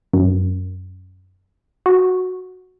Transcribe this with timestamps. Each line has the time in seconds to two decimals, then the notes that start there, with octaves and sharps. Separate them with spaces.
0.13 F#2
1.86 F#4